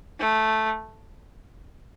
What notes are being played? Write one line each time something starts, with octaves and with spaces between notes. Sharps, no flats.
A3